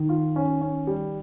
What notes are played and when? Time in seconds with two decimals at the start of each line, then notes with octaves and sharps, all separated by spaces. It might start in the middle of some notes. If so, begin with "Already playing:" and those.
Already playing: D#3
0.09 F4
0.36 C#4
0.61 C#4
0.87 G3